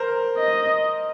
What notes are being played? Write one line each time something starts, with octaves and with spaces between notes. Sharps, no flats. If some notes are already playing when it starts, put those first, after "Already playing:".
Already playing: A#4 C5
D#5